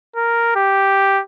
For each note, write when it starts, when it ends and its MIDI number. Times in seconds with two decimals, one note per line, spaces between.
0.16 0.52 70
0.56 1.21 67